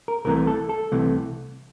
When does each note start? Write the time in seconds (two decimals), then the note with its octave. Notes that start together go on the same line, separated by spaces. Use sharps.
0.08 A#4
0.25 C2 C3 E3 A3 A#4
0.47 A4
0.69 A4
0.92 C2 C3 E3 A3